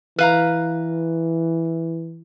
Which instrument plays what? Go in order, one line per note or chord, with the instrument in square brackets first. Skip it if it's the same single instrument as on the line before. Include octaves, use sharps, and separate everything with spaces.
[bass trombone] E3 [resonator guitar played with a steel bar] B4 F5 A#5